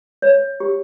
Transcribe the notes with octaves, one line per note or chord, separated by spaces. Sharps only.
C#5
G4